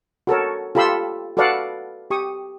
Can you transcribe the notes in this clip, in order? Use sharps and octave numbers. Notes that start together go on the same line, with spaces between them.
F#4 A4 A#4 C#5
F4 G4 A4 B5 C6 E6
F#4 A4 B4 D5 F5 F#5
G4 C#6 D#6